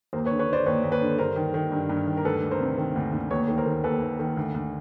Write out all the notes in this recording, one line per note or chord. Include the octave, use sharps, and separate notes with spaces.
D#2 A#4 C5
B4 C#5
D3
B4 C#5
D3
C5 D5
D#2 B4 C#5
D#2
B4 C#5
D3
G2 A#4 C5
D#3
D#3
G2
G2
D#3
A#4
D2 A4 B4
D2
A#4 C5
C3
D#3
D2
D2
D#2 B4 C#5
D#3
A#4 C5
D#3
D#2 A4 B4
D#2
D#3
D2
D2